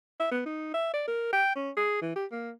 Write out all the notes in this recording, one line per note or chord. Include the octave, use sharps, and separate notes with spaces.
E5
B3
D#4
E5
D5
A#4
G5
C#4
G#4
E3
G4
A#3